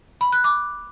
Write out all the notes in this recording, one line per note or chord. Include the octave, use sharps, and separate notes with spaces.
B5
F#6
D6